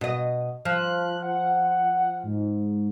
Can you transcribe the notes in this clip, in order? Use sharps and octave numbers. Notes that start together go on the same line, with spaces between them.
B2 D#5
F3 F#6
F#5
G#2